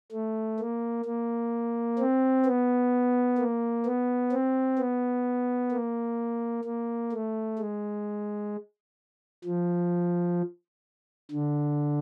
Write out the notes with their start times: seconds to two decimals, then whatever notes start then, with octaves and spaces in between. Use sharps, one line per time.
0.12 A3
0.60 A#3
1.06 A#3
1.99 C4
2.46 B3
3.39 A#3
3.86 B3
4.33 C4
4.79 B3
5.72 A#3
6.65 A#3
7.12 A3
7.59 G#3
9.45 F3
11.31 D3